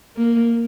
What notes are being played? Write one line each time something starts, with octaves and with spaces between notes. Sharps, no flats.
A#3